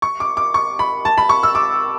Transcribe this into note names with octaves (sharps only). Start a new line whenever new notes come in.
C#6
D6
D6
C#6
B5
A5
B5
C#6
E6
D6